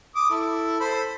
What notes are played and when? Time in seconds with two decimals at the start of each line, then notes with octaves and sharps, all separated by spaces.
0.15 D6 D#6
0.30 E4 A4
0.80 A4 C5 B5